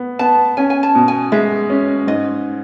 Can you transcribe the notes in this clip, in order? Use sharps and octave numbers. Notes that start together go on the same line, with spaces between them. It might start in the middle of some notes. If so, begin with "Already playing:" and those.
Already playing: B3
B3 A5
C#4 G#5
G#5
A5
B2
G#5
G#3 E5
C#4
G#2 D#5